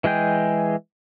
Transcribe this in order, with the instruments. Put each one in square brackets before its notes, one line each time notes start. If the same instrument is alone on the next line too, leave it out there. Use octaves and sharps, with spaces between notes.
[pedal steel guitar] E3 G#3 G#4 G5